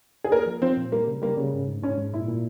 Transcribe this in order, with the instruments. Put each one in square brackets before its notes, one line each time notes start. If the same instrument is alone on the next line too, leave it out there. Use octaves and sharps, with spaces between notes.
[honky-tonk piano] G#4
[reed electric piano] A#3 [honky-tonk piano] A#4
[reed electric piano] F3
[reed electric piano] F3 [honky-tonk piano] C4
[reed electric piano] A#2
[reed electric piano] G3 [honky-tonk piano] A#3
[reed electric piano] C#3
[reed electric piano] G3 [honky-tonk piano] A#3
[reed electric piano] C#3
G#2
G#2
[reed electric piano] G#2 [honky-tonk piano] C#4
[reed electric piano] G#2
[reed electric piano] A#2 [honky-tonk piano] E4
[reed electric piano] A#2